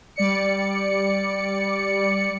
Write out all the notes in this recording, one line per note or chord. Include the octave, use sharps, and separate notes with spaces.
G3 D5 C#7